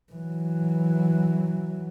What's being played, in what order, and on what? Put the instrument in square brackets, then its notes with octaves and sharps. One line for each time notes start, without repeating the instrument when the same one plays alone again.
[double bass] E3 F#3